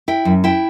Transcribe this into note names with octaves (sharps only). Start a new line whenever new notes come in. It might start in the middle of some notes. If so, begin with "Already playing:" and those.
E4 G5
F#2
E4 G5